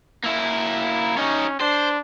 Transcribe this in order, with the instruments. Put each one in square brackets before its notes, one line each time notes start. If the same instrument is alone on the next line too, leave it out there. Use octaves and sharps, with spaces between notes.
[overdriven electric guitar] A#3 E4
[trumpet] C#4 [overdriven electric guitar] D#4 C#5
[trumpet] D4 [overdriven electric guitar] C5